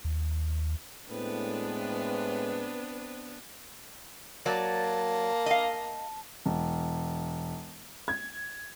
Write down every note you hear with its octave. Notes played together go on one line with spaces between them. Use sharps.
D#2
A2 G#3 B3 C4 D4 B4
F#3 A#3 D5 A5
D#5 F5
E1
G#6